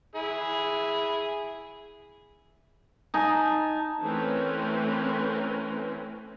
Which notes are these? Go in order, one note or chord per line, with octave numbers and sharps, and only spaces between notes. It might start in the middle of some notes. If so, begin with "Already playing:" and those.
E4 G#4
D#4 G#5 A5
E3 A3 C4 C#4 A#4 B4